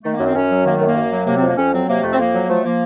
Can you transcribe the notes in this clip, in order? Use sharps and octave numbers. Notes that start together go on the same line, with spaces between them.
D#3 A3
A#3
F#2
C4
F#2 C#4
F#3
D#3 A#3
F#2 A3
A#3
F#2
F#3
C3 A#3
C4
F2 A#3
F2 C#4
F#3 C4
C3 A#3
F2 A3
C4
F2 A#3
F#3
F3 A3
F3 A#3